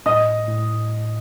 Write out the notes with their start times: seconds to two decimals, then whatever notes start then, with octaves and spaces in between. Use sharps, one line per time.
0.06 A2 D#5 D#6
0.48 A2